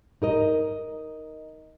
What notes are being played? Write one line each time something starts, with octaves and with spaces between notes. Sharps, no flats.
D#4 A#4 D#5